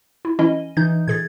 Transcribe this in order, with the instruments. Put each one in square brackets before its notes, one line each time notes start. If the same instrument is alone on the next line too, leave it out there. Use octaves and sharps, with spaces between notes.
[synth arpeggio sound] E4
[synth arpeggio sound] E3 C#4 E4 [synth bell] D#5
[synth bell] E3 D#4 [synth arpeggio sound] G6
[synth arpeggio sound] A#2 G#4 A6 [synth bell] G#6